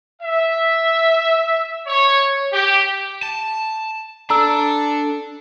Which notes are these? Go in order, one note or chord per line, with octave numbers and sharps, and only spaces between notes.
E5
C#5
G4
A5
D4 A4 A#5 E6